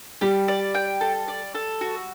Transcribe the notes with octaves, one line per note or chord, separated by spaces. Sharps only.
G3 G4
D5
G5
A4
D5
A4
F#4